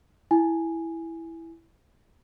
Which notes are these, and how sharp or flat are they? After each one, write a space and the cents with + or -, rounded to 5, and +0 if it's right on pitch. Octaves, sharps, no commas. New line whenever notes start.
E4 +0 G#5 +0